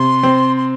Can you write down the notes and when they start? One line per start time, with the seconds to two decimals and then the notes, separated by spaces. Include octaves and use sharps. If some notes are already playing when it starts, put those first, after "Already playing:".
Already playing: C3 C6
0.23 C4
0.57 C6